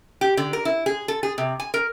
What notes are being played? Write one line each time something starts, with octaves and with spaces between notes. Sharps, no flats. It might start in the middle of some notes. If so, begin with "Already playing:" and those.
G4
D3
A#4
E4
G#4
A4
G#4
C3
G#5
A#4